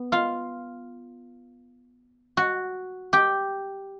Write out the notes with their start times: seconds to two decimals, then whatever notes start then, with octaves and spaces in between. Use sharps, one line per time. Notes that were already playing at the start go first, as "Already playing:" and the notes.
Already playing: B3
0.12 F4 F5
2.37 F#4 F#5
3.13 G4 G5